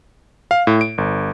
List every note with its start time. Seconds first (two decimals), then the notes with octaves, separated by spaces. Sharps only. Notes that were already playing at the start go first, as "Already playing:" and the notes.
0.51 F5
0.67 A2
0.81 D7
0.98 G1